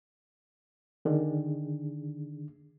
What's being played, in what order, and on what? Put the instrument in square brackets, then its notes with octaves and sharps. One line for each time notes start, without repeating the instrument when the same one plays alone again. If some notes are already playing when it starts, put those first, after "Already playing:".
[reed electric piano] D3 D#3 D4 G#4